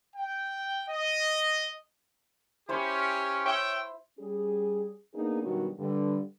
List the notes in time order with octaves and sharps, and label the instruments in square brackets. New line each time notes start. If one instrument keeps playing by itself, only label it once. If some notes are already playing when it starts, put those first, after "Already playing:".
[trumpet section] G5
D#5
[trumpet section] C#4 G4 [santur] E4 C5
[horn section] C#5 E5 G5
[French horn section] G3 C#4 G#4
A#3 B3 D4 D#4 G#4
G2 B2 D#3 F#3 F#4
G2 D3